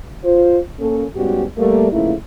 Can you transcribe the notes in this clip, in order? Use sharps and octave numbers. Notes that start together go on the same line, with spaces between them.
F4 C5
A#3 C#4 A4
G#2 G3 B3 C#4 F#4 G4
G3 A3 A#3
C#3 F3 A3 A#3 D#4 E4